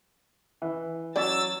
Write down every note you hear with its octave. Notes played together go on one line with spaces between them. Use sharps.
E3
F#3 C#4 D5 E6 A6